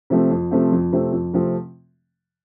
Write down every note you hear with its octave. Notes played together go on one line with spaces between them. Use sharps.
C3 F3 A3 C4
F2
C3 F3 A3 C4
F2
C3 F3 A3 C4
F2
C3 F3 A3 C4